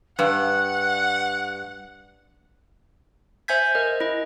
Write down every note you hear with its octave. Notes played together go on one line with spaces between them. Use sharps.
G2 B4 F#5 F#6
C5 E5 G#5 G6 G#6 B6
A#4 D#5
E4 D#5